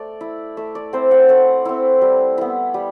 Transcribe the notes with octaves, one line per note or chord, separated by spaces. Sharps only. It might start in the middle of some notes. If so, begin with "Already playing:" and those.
Already playing: A3 D5
E4
A3 E5
D5
C4 E4 C5
F#5
A3 F#5
C4 E4
G3
B3 E4
G3